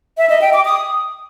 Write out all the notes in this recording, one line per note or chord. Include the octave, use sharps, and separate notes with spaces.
E5
D#5
G5
D6
D#6